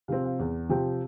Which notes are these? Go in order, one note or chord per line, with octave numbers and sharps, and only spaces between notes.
C3 F3 C4 F5
F5
E2
C3 F3 C4 G5